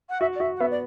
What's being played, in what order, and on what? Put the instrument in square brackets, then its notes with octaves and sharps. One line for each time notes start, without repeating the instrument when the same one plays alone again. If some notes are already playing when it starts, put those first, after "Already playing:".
[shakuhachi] F#5
[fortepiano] F#4 [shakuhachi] E5
[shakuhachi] D5
[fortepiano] F#4 [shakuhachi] E5
[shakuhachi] F#5
[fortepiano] B3 [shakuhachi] E5
[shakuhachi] D5